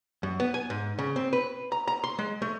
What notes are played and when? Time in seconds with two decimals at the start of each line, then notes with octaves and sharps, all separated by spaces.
0.23 F#2
0.40 B3
0.54 G#5
0.70 G#2
0.99 C#3
1.16 C4
1.33 B4
1.72 A#5
1.88 A#5
2.04 C6
2.19 G#3
2.42 A3